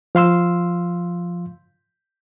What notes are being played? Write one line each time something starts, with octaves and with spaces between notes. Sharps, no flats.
F3 F5 C6 E6